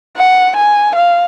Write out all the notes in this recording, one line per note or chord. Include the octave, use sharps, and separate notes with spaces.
F#5
G#5
F5